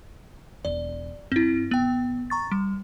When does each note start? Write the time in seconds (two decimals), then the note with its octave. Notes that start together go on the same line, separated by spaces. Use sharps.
0.65 E1 D5
1.32 G2 C4 E4
1.71 A1 E2 B3 G5
2.30 A#5 C#6 A6
2.52 G3